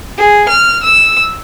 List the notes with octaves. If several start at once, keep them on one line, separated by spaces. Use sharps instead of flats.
G#4
F6
E6